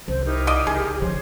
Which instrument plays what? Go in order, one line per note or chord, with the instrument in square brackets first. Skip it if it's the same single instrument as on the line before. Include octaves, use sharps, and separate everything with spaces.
[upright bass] C2 [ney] C5
[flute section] D#4 E4 A#4 [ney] G4
[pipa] D5 D#5
[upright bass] C#2 [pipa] G#4
[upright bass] D3 F3 [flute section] C5 C#5